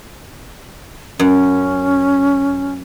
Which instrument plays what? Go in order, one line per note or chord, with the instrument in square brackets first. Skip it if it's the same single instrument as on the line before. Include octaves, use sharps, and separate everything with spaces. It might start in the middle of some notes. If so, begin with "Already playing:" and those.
[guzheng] F#2 [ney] C#4